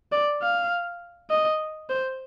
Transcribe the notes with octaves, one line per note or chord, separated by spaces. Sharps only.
D5
F5
D#5
C5